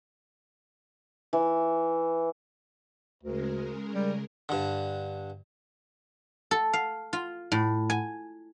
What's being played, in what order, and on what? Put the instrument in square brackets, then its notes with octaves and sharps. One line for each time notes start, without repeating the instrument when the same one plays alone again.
[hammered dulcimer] E3
[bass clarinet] D2 [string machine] C#3 G#3 A#4
[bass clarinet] G3
[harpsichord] G2 D3
[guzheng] A4
F5
F4
A2
G#5